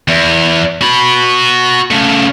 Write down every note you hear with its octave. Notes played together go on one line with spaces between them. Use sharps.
E2
F#4 B5
C#3 A3